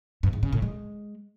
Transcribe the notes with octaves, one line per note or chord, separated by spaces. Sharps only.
G2
G#2
C#3
A2
G#3